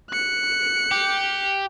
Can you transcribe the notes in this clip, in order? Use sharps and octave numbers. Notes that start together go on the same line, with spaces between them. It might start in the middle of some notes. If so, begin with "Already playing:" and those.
F#6 C#7
G4